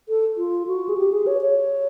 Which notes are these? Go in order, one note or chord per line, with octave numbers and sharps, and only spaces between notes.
A4
F4
F#4
G#4
G4
G#4
C#5
C#5